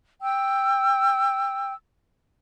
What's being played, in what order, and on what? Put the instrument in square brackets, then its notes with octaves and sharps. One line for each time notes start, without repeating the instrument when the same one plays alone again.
[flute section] G5 E6